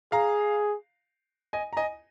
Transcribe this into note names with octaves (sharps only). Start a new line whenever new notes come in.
G#4 F5 A#5
D#5 G#5
A#5
D#5 G#5